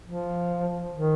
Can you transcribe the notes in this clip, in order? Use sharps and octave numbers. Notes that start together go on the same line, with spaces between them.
F3
D#3